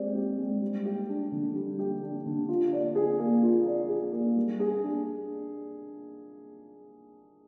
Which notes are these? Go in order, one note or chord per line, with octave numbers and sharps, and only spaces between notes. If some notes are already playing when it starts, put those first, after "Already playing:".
Already playing: G#3 C4 G4 D5
G4
G#3
G3
G4
D4
D3
G3
G4
D4
D3
F4
D5
G#4
A#3
F4
D5
G#4
A#3
G3
G#4
D4